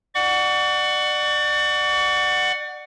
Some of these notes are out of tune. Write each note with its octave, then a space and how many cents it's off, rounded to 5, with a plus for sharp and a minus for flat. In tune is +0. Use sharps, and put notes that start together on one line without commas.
D5 +30 F#5 +5 C#6 +40